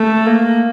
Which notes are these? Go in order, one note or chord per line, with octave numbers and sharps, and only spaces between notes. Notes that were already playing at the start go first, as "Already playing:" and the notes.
Already playing: A3
A#3